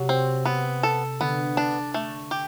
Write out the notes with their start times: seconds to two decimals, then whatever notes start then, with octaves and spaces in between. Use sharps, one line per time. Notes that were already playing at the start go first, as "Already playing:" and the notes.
Already playing: C3 F#3
0.09 C4
0.45 B3
0.83 A4
1.20 D3 B3
1.57 D4
1.94 A3
2.31 G4